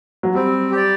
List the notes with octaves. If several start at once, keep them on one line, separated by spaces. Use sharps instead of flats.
F#3
G3 C4
G4 D5